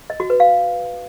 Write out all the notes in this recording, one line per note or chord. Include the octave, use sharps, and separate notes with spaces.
D#5
F#4
B4
F5